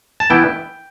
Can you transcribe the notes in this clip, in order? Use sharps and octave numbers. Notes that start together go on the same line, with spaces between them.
A5
E3 B3 E4 G5